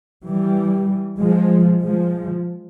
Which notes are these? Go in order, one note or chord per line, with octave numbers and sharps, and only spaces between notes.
E3 G3
F3 G#3
F3 G#3